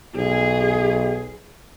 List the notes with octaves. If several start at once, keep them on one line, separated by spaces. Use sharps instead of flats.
B1 G#4